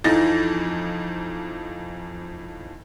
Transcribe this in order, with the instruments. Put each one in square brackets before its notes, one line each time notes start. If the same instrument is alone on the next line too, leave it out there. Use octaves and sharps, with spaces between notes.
[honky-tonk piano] F2 E3 F3 D#4 A6 A#6